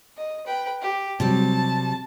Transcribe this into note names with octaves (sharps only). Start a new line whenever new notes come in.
D#5
B4 G5
G4
C3 F#3 G3 A5